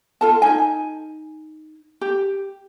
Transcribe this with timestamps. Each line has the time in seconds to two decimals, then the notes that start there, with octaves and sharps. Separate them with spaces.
0.21 F4 A4 A5
0.42 D#4 G#5
2.01 G4